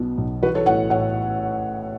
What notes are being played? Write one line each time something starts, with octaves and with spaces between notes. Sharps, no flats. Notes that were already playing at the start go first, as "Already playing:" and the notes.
Already playing: B1 B2 B3
B1
E3 F#4 B4
A4 C#5
A1 C#5 F#5
A2 C#5 F#5